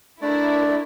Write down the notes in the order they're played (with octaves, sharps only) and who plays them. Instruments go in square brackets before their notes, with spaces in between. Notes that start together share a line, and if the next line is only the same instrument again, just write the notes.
[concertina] A3 D5 [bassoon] D4 [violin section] E4 A#4